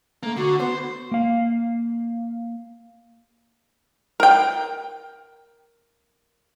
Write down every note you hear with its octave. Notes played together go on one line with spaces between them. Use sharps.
A3 A#3
D3 F#4
B3 C5
A#3 F5
A#4 G5